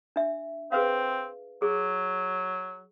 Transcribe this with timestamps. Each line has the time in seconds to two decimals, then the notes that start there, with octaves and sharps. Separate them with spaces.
0.16 D4 E5
0.72 C4 G#4 B4 F5
1.62 F#3 G#4